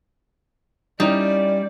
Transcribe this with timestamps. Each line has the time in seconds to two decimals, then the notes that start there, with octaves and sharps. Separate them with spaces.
1.00 G3 C#4 D#4 E4 D5 G5